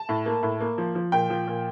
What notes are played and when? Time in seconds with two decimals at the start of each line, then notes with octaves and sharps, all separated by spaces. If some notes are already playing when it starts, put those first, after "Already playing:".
Already playing: A5
0.09 A2
0.26 A#3
0.43 A2
0.60 A#3
0.78 F3
0.95 F3
1.12 A#2 G5
1.30 F3
1.48 A#2